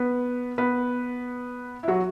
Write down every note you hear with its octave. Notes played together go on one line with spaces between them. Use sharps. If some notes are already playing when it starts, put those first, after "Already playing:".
Already playing: B3 B4
B3 B4
E4
F#3 F#4